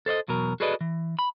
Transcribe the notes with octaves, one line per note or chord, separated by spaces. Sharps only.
A4 C5 D5 D#5
E2 B2 F#3 A#4
F#4 G#4 A4 B4 D5 D#5
E3
B5